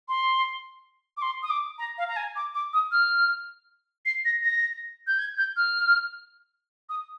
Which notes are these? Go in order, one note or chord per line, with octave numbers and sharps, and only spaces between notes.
C6
D6
C6
D#6
D6
A#5
F5
A#5
G#5
D6
D6
D#6
F6
C7
A#6
A#6
G6
G#6
G6
F6
D#6